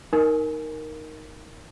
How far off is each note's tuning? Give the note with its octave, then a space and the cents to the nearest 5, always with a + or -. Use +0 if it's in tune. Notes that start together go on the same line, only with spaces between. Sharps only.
D#4 +0 A#4 +0 G#5 +0